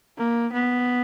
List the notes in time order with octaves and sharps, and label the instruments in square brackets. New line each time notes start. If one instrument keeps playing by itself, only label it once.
[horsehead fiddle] A#3
B3